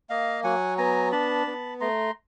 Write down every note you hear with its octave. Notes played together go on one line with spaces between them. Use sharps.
A#3 D#5 F5
F#3 F#5 G#5
B3 G#5 A#5
D4 A5 B5
B3
A3 A#5 C6